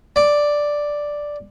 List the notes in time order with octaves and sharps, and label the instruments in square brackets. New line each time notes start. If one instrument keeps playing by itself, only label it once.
[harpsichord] D5